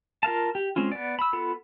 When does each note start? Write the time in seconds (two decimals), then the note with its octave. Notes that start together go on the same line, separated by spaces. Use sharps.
0.23 F4 A#4 F5 A5
0.55 G4
0.76 G#3 C4 C#4 F4
0.92 B3 D5
1.19 B5 E6
1.33 B3 F4 A4 B5